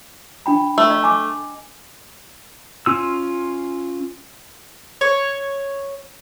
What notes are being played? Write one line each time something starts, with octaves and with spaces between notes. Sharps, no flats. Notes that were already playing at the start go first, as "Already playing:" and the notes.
D4 G5 B5
A3
D#5
D#5 G#5 D6
C#4 F4 E6
C#5